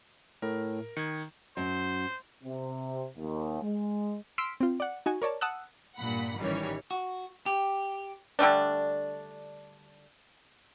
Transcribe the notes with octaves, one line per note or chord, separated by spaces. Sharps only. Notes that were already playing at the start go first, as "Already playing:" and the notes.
A2 A#4
D#3 G#6 C#7
F#2 C5
C3
D#2
G#3
C6 E6 F6 B6 C7 D7
C4 F4
D5 F#5
D#4 F#4 G#5
A#4 C#5 D5 A5
F#5 A5 D#6 E6 F#6
G2 A#2 F#5 B5
A1 D#3 E3 G3 C#4 C#5
F#4
G4
D3 G3 A3 D4